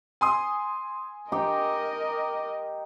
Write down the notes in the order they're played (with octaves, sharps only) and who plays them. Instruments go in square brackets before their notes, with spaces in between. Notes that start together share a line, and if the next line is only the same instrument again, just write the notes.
[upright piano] G#5 C6 D#6
[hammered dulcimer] D#4 G4 G5 [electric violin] A#4 D#5